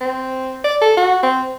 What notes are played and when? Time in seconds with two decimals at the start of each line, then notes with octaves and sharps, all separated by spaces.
0.01 C4
0.64 D5
0.81 A4
0.97 F#4
1.23 C4